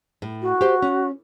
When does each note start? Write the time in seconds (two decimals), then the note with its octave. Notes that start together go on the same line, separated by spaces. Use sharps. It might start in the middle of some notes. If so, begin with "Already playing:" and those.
0.22 A2
0.42 F#4
0.61 G4 C5
0.82 C#4